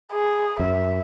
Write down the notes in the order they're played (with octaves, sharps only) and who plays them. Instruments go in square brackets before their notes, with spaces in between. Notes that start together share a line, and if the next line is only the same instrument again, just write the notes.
[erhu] G#4
[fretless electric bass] F#2 [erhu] E5